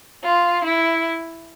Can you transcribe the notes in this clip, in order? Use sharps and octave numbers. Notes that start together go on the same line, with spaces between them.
F4
E4